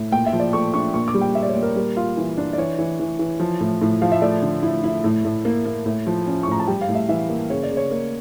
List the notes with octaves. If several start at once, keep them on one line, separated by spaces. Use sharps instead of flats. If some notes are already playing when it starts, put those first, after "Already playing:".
Already playing: A2
A#2 G5
E5
F3
D5
A3 C#6
D4 C#6
A#2 C#6
D6
G3
G5
A#3 E5
D5
C#5
A#2
A#4
G3 A#4
F4
E3
D4
D5
E3 C#5
E3
E3
E3
F3
A2
A2
F3 F5
E5
A3 D5
D3
E4
E4
A2
A2
A#3
A#3
A2
F3
C#4
C#6
A2 A#5
A5
G3 G5
F5
A2
E5
E3 E5
A#3
C#3 C#5
D5
C#3
C#5
A#3